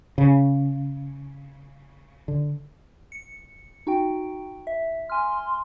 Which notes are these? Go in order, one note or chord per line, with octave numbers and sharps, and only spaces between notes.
C#3
D3
C#7
D#4 F#4 G5
E5
G#5 C6 F6